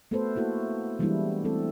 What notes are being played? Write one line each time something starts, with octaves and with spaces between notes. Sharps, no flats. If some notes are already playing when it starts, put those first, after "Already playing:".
A3 B3 F#4 A4 B4 C5
A#3 E4 F#4 A4
E3 G3 G#3 B3 D4 E4
A3 C4 A4